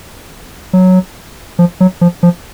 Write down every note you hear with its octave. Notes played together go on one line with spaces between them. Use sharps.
F#3
F3
F#3
F3
F3